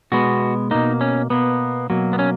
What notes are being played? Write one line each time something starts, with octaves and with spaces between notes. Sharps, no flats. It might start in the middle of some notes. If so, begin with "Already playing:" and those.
B2 G#3 B3 F#4
B2 A#3 D#4
C#4
B2 A#3 B3
B2 F#3 A#3
B3
C#4